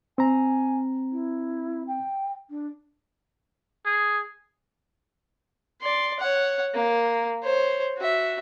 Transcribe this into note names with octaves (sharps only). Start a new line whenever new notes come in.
C4 G#5 A#5
E4
G5
D4
G#4
D5 C6
C#5 F#5
A#3
C5 C#5
F#4 E5